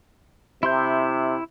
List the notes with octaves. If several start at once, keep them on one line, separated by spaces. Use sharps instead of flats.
C3 E4 C6 G6